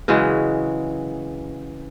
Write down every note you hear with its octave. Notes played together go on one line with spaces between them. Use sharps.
C#3 E3 F#3 G#3